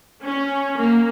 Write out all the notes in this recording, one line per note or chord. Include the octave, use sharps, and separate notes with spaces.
C#4
A#3